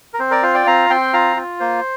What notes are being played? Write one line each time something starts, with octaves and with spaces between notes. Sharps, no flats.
A#4
C4 C5
A#4 D5
F4 C5 F5
D5 G5
C4 F5 A#5
C4 G5 C6
F4 F5 A#5
F4
A#3 C5